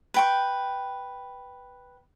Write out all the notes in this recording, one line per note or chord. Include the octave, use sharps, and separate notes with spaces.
B4 G5 C#6